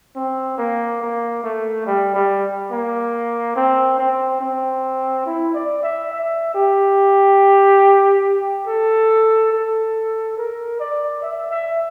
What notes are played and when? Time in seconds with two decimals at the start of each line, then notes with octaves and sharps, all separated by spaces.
0.16 C4
0.58 A#3
1.01 A#3
1.43 A3
1.86 G3
2.14 G3
2.71 A#3
3.56 C4
3.98 C4
4.41 C4
5.26 E4
5.54 D5
5.83 E5
6.11 E5
6.54 G4
8.67 A4
9.52 A4
10.37 A#4
10.80 D5
11.22 E5
11.50 E5